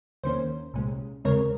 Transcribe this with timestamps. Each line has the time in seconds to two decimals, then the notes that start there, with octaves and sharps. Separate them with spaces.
0.23 D#2 D#3 A#3 C#4 C5
0.74 C2 A#2 G#3 C#4
1.25 D#2 C#3 G#3 C4 A#4 C#5